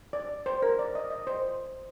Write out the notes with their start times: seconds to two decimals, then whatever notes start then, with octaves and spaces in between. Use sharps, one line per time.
0.13 D5
0.46 C5
0.62 A#4
0.79 D5
0.95 D#5
1.10 D#5
1.27 C5